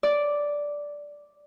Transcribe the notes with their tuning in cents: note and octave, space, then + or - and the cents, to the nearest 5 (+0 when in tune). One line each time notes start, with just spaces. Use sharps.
D5 -5